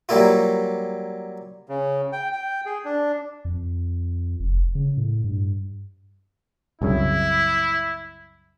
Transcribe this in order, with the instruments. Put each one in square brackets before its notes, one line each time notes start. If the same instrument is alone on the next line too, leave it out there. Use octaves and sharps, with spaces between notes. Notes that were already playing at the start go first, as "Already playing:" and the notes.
[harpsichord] F#3 G3 A#3 E4 F4
[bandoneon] C#3
G5
G5
G#4
D4
[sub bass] F2
F1
C#3
A2
G2
[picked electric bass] C2 F#2 C#3 [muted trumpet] E4